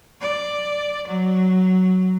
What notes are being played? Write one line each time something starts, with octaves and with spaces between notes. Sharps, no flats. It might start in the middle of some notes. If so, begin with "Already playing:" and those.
D5
F#3